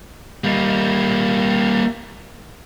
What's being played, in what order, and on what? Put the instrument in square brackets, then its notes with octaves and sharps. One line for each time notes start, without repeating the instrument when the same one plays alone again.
[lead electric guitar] G3 A#3